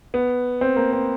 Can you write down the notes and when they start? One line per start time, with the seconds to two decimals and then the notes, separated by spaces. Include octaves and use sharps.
0.14 B3
0.61 C4
0.76 A#3
0.93 C4